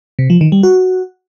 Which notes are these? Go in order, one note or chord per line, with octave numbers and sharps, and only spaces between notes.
C3
F3
D#3
G3
F#4